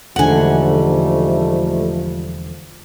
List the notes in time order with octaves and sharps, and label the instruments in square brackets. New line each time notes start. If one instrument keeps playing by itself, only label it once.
[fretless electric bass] E1 D3 [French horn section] G#2 G3 A3 [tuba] F3 [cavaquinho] F#5 G#5